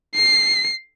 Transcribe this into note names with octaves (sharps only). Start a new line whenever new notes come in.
C7